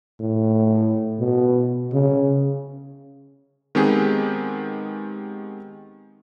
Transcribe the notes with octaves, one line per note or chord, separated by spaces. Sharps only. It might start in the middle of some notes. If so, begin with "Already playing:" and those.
A2
B2
C#3
D#3 G#3 B3 C4 G4 G#4